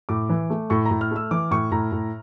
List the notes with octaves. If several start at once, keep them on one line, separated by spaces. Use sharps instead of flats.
A2 D6
E3
A3
A2 C#6
A#5
A2
F6
A3 E6
E3 D6
A2 C#6
A2 A#5
A2